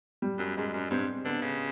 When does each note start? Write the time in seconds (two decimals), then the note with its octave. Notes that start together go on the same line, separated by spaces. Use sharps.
0.22 G3
0.39 F#2
0.57 F#2 G#3
0.73 F#2
0.90 G2 C4
1.25 D3 B3
1.42 C#3